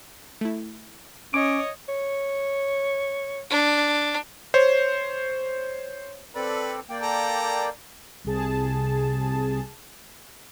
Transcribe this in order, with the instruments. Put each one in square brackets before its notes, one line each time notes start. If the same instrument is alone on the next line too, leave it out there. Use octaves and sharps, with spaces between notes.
[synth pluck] A3 E4
[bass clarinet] C#4 [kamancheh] C#5 D#5 [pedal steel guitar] D6
[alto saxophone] C#5
[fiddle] D4
[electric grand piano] C5 C#5
[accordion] C4 A4 D5 [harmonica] B4
[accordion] A#3 D5 G5
[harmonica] A4 A#5
[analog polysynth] C2 C3 G#4 A5